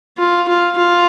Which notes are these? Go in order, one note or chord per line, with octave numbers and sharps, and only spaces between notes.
F4
F4
F4